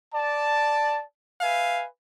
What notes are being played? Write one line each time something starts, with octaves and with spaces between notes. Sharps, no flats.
D5 A5
B4 E5 F5 G#5